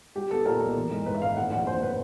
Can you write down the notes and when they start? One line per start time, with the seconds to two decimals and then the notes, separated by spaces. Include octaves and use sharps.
0.15 G3 G4
0.30 B3 A4
0.46 A#2 A#4
0.60 B1
0.76 E3
0.91 G#2
1.06 G#2 B4
1.15 E5
1.21 G#1 F5
1.37 A2 F#5
1.52 A#1 F#5
1.67 A#1 C5
1.82 A2 B4